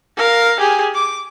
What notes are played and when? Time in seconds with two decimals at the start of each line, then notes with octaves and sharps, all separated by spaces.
0.17 A#4 F5
0.60 G4 G#4
0.94 D6